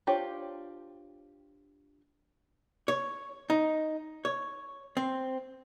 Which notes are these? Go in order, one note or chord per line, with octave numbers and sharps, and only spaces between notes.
D4 F4 G4 C5 C#5
C#5
D#4
C#5
C4